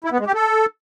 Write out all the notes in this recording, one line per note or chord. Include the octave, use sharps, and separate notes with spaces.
E4
B3
G#3
G4
A4